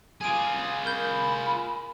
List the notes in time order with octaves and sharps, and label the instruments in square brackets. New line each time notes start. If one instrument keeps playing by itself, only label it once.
[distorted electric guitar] F4 G#4 [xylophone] G#5 D7
[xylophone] A#4 G6 [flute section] B5